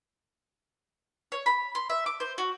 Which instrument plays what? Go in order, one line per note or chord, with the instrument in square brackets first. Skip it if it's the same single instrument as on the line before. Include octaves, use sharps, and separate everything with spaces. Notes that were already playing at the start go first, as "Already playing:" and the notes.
[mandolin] C#5
B5
C6
E5
D6
C5
F#4